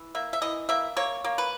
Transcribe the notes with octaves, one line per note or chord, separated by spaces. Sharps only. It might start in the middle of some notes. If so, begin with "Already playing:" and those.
Already playing: E3
A#3 E5
E5
E3 D#5
A#3 E5
A#3 C#5
A#3
B4